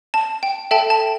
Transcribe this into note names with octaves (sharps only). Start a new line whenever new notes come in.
A5
G5
A4 E5 G5 A5
A5